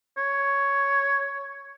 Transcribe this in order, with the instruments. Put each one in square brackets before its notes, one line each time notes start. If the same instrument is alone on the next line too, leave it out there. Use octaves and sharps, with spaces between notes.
[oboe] C#5